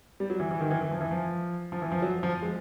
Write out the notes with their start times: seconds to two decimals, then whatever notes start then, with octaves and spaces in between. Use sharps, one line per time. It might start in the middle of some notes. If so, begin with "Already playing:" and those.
0.20 G3
0.30 F#3
0.40 E3
0.51 E3
0.60 D#3
0.70 E3
0.81 E3
0.91 F3
1.01 E3
1.11 F3
1.72 F3
1.82 E3
1.92 F3
2.02 F#3
2.23 F3
2.42 G#3